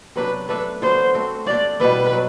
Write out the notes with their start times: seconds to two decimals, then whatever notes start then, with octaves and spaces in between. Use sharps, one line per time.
0.16 C3 F#3 B3 D4 B4
0.49 A3 D4 A4 B4 E5
0.82 D3 F#3 B3 C5
1.14 A3 C4 F#4
1.47 A3 D4 G4 D5
1.80 B2 G3 B3 E4 B4
2.12 F#3